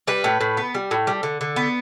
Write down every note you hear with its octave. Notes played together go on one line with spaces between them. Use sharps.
G3 B4
A2
A2
B3
G3
A2
G3
D3
D3
B3